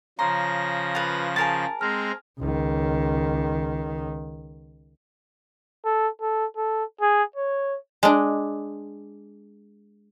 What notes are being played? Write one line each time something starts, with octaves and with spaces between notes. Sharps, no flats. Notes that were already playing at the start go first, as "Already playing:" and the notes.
C#3 F3 A#5 C6 A#6
F4 B4
G#4 A#4 A5 A6
G#3 C4 A#5 F6
C#2 D#3
A4
A4
A4
G#4
C#5
G#3 D4